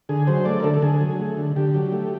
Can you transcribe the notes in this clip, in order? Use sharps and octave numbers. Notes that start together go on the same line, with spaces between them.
D3 G#4
F#3 C5
A3 D5
A#4
D3 A4
A4
D3 G#4
F#3
A3
D3
D3 G4
F#3
A3